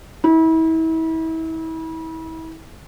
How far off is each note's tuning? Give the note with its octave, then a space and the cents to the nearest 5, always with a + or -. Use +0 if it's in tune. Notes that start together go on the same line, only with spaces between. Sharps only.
E4 -35